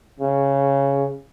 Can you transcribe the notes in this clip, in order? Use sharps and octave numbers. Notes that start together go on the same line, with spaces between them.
C#3